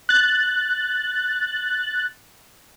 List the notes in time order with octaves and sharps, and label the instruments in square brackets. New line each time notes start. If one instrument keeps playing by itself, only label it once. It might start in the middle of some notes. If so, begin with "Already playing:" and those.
[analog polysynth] F#6 A6